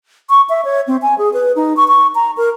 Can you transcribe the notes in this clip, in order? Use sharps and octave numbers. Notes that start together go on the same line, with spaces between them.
C#6
E5
C#5
C4
G#5
G#4
B4
D#4
C#6
C#6
A#5
A#4